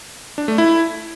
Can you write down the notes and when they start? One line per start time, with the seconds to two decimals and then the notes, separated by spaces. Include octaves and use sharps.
0.38 D4
0.48 A3
0.58 E4